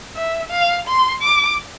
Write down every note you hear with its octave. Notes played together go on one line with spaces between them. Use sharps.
E5
F5
C6
D6